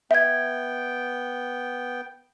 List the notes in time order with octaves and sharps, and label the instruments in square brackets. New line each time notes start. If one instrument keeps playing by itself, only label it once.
[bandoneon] B3 G5 [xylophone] E5 G#6